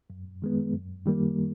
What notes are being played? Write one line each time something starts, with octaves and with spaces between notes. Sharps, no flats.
F#2
D#3 G#3 B3
F#2
D#3 G3 A#3